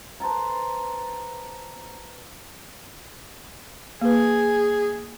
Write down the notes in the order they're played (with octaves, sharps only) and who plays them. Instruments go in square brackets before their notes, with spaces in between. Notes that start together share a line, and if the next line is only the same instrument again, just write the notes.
[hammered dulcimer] B4 C5 A5 A#5
[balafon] A#3 B4 [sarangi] G#4